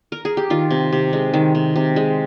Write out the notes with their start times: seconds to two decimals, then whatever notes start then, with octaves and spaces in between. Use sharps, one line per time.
0.12 A#4
0.25 G#4
0.37 G4
0.50 D#3 F4
0.71 C3
0.93 C3
1.13 G#3
1.34 D#3
1.55 C3
1.76 C3
1.96 G#3